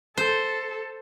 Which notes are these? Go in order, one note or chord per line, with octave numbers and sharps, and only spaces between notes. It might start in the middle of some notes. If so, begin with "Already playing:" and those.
A4 C5